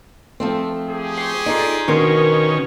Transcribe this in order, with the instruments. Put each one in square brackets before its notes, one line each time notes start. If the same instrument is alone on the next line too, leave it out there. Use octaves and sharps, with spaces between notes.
[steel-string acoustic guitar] F3 A3 C4
[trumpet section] G4 G#4
[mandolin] C#5 C6
[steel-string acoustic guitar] D#4 [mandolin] F4 A4 D5
[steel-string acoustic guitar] B2 [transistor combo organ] D#3 C#4 [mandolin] D4 A#4 C6